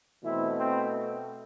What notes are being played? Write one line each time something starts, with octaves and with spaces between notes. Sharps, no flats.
B2 E3 A3 C4 E4
C4